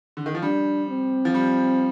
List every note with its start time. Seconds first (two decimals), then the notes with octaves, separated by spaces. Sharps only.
0.17 D3
0.26 D#3
0.35 F3
0.42 G3 D4
0.89 C4
1.25 F3
1.34 G3